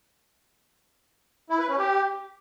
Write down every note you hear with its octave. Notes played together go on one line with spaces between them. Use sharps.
E4
B4
C#4
G4